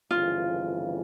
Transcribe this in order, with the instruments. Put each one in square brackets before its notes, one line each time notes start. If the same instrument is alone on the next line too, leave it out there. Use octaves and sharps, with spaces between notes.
[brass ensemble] G1 F2 C#3 E3 [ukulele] F4